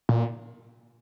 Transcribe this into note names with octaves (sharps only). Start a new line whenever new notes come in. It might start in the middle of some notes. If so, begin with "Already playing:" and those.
A#2